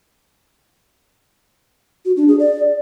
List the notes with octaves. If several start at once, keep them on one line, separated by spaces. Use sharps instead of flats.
F#4
D4
G#4
D5